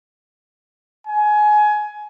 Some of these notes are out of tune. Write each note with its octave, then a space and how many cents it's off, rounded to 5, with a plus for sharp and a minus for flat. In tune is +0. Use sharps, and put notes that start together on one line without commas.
G#5 +20